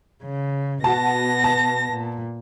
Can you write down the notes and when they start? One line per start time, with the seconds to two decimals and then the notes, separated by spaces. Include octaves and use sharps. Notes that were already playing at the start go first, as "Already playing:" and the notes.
0.23 C#3
0.84 B2 B3 F#4 A5 A#6
1.44 A5
1.92 A#2